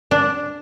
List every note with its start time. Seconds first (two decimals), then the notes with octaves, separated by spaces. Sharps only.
0.11 D4